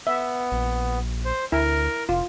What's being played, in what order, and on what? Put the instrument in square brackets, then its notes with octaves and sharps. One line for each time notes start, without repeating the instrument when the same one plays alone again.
[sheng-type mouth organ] B3 [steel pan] E5
[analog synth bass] A#1
[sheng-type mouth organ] C5
[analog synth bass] D2 [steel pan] E4 [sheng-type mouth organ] A#4
[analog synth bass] F1 [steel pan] F4